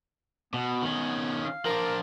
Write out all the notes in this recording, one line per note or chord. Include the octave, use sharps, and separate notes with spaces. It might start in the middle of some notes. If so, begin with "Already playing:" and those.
B2 B3
D#3 C#4
F5
F3 D4 A#4